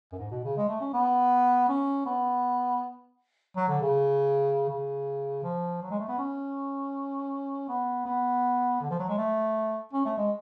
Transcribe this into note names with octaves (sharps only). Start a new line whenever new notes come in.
F#2
G#2
B2
C#3
G#3
A3
C#4
B3
C#4
B3
F#3
D3
C#3
C#3
F3
F#3
G#3
A3
B3
C#4
B3
B3
D3
F3
F#3
G#3
A3
C#4
A3
G#3